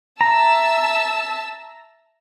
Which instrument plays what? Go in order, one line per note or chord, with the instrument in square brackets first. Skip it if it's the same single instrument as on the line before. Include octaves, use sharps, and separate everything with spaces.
[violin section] E5 A5 E6 [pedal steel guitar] A#5